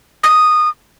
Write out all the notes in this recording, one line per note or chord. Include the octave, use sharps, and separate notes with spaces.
D#6